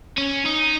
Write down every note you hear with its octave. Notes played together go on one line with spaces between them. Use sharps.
C#4
D#4